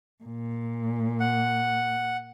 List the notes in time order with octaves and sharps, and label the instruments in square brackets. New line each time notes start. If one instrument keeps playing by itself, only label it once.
[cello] A#2
[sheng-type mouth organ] F#5